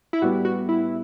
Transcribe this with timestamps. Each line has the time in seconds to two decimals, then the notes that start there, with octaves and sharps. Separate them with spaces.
0.13 E4
0.22 A2 G3 B3 F#4
0.45 F#4
0.69 E4